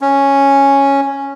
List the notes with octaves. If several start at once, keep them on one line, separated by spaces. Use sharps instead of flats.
C#4